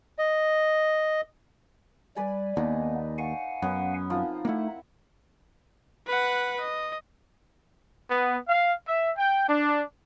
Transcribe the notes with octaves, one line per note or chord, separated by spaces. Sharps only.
D#5
G3 B4 D5 G#5
D#2 A#3 B3 D4 D#4
F5 F#5 G#5 C#6
F#2 B3 C#4
F3 A#3 C4 D#4
A3 A#3 E4 E5 F#5
B4 F#5
D#5
B3
F5
E5
G5
D4